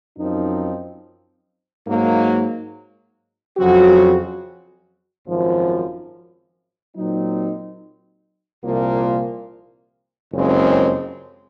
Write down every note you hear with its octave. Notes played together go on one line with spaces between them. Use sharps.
F#2 F3 C4 D#4
G#2 F#3 A#3
F2 C#3 F#3 C4 F#4
G#1 F#2 F3
A#2 F#3 C4 D#4
C2 A#2 F3 A#3 F4
F#1 F2 C#3 G#3 C4